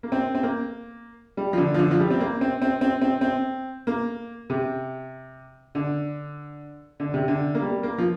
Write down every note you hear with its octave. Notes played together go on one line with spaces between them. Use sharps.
A#3
C4
C4
A#3
G3
F3
D3
F3
D3
F3
G3
C4
A#3
C4
C4
C4
C4
C4
A#3
C3
D3
D3
C3
D3
A#3
G3
A#3
F3